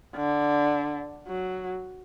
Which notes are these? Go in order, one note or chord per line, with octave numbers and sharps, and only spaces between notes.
D3
F#3